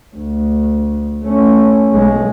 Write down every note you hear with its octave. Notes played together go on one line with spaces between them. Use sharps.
D2
A3 C#4
B1 G#3